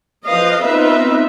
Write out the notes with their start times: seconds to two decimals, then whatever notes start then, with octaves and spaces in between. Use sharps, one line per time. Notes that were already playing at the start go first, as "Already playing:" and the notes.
0.25 F3 B4 D#5 F5
0.61 B3 C4 D#4 F4 B4 E5